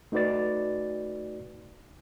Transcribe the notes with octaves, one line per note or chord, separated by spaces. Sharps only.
A3 D#4 F#4 B4 D5 A6